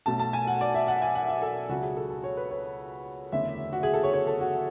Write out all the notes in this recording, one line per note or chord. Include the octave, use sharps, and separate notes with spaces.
B1 B2 A3 A5
A5
G#5
F#5
D5
E5
F#5
G#5
F#5
E5
A4
C#2 C#3 F#3 F#4
G#4
A4
A4
C#5
B4
C#5
F#1 E2 D3 A3 E5
F#4
G#4
A4
C#5
C#5
A4
F#4